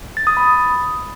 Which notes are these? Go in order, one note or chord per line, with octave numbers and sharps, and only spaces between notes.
A6
D#6
B5